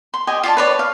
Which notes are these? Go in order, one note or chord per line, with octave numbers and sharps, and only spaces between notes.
C6
G4 D#5 G#5
F4 D5 A5
B4 C#5 D5
F5